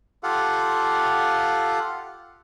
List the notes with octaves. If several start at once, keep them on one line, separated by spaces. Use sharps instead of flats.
F4 G4 A4 F5 F#5